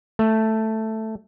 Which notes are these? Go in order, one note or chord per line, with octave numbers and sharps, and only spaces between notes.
A3